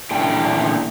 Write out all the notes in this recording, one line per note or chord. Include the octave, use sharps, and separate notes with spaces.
A#2 E3 A3 D4 G5 A5